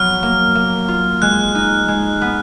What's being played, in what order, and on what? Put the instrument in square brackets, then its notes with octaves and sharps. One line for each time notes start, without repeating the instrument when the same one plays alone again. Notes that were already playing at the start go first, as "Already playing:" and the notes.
Already playing: [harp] F#3 B3 [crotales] F6
[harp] A#3
A#3
F4
[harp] G#3 [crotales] F#6
[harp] D#4
G#3
B3